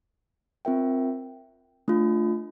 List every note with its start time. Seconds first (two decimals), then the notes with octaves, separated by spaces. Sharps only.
0.65 C4 F4 A#4 E5 G5
1.88 A3 D4 F4